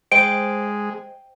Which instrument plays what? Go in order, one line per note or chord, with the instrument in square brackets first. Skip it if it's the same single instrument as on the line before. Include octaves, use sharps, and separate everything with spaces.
[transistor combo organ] G#3 [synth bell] C5 D#5 G5 [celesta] D7